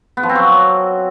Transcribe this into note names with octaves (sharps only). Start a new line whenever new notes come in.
B3
F3
C4
F#3